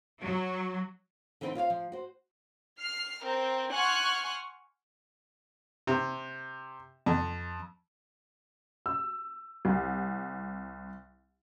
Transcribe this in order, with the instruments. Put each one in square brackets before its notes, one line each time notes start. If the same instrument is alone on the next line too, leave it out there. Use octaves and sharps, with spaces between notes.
[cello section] F#3
[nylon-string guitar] D3 E3 B3 C4 D4 D#4
F4 C5 C#5 F5
F3
F#4 C5
[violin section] F6 C7
C4 A#4
F#5 G#5 C6 C#6 F6 F#6
[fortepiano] C3
F2
[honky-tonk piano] E6
C2